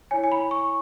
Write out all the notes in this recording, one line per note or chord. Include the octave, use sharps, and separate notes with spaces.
E4 C#5 G#5
G#5
B5
C#6